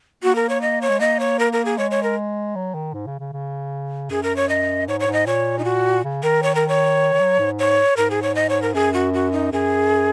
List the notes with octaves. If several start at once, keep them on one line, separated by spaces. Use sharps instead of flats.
A#3 F#4
A#4
C#5
D#5
C#5
G#3
A#3 D#5
C#5
A#4
A#4
G#4
G#3 C#5
C#5
A#4
F#3
D#3
G#2
C#3
C#3
C#3
F#2 G#4
A#4
C#5
D#5
G#2 C#5
C#5
G#2
D#5
A#2 C#5
D#4
F#4
C#3
D#3 A#4
C#5
A#4
C#5
D#3
F#3
G#2
C#5
G#2 A#4
G#4
C#5
D#5
C#5
A#4
F#2 G#4
F#4
F#4
D#4
F#2 G#4